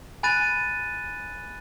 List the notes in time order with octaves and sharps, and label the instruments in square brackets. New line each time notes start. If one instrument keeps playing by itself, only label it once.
[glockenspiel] G#5 B5 F#6 A6 D#7